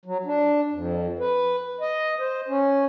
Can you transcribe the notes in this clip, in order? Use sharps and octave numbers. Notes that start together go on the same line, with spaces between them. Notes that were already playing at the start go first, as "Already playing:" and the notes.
F#3
D4
F2
B4
D#5
C5
C#4